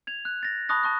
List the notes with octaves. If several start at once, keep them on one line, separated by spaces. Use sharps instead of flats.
G#6 F7
F#6
A6 A#6
A5 B5 C#6 D#6 F#6 A#6
A5 C#6 F#6